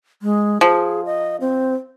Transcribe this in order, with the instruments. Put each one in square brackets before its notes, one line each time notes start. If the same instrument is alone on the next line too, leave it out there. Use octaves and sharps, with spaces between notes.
[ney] G#3
[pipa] F3 [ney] G#4
[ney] D#5
C4